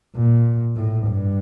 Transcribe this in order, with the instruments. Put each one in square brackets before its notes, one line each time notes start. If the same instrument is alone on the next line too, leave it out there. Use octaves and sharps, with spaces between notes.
[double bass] A#2
A2
G2